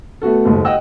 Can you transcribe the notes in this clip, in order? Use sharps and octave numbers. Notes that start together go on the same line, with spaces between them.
A3 B3 F#4 A4
F#1 D#2 G#2 A4
D#5 F#5 G5 E6